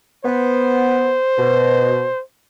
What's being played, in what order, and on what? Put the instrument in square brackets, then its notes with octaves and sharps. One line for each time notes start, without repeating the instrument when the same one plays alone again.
[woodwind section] B3 [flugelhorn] C5
[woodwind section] B2